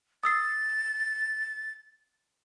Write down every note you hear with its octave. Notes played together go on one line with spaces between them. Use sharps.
D#6 E6 A6 C7